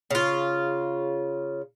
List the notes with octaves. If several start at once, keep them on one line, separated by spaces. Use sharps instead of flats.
C#3 F4